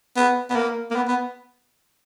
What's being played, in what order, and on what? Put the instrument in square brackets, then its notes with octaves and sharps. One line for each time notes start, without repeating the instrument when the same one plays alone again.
[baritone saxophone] B3
B3
A#3
A#3
B3
B3